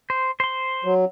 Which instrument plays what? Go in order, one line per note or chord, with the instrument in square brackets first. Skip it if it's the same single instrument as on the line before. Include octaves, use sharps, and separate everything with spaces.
[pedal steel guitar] C5
C5 C6
[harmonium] F#3